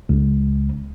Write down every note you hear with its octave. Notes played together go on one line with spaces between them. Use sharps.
C#2